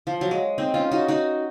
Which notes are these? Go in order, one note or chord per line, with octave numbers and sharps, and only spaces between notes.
F3
F#3
G#3
C4 D#4
C#4 F4
D#4 F#4
D#4 F#4